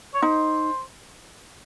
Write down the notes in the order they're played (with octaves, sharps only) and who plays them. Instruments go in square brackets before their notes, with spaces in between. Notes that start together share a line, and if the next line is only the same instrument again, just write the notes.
[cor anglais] C#5
[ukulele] D#4 [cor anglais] C5